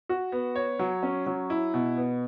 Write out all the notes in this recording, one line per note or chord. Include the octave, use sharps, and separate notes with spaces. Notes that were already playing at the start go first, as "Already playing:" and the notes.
F#4
B3
C#5
F#3
C#4
F#3
E4
B2
B3